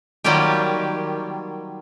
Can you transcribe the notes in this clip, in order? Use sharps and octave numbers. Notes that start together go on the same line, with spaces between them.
D#3 F#3 G3 A#3 F4 G4